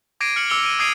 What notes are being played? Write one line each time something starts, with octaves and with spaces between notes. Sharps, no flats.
D6 G#6 A#6 C7 D7 D#7
F6 C#7 F#7
D6 E6 C#7 F7 G7
D7 D#7
D#6 G#6 C7 D7 D#7 F7